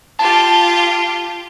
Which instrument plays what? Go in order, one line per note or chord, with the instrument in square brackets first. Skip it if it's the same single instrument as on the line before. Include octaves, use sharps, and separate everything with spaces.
[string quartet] F4 G4 [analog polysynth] A5